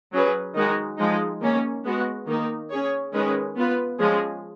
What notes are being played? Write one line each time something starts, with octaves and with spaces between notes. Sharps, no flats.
F#3 C#4 G#4 B4
D#3 G#3 D#4 F#4
F3 G#3 D#4
D#3 A#3 C#4
G#3 B3 F#4
D#3 A#3 D#4
C#4 G#4 C#5
D#3 G#3 C#4 G#4 B4
B3 F4 B4
F3 G#3 C#4 G#4